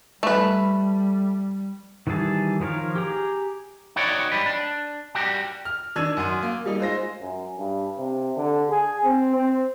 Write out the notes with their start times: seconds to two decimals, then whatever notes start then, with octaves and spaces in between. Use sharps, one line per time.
0.23 G3 A3 B4
2.07 D#3 E3 G3 G#4 A5
2.60 D#3 F3 A#4 C#5 F5
2.95 G4 G#4 G5 A#5 D6
3.96 D#4 F#4 C#5 D5
4.32 G#2 G3 B4
4.46 D4
5.15 G3 F#4 G4
5.65 F6
5.96 D#3 D4 E6 G#6 D#7
6.17 F#2 F#5 C6 D#7
6.43 A#3
6.66 G3 D#4
6.79 G#3 F4 C5 A#6
7.21 F#2
7.58 G2
7.98 C3
8.36 D3
8.70 G#4
9.04 C4
9.36 C4